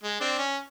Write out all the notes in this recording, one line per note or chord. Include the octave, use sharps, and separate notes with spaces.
G#3
C4 D4
C#4